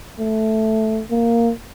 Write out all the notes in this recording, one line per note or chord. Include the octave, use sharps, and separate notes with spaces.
A3
A#3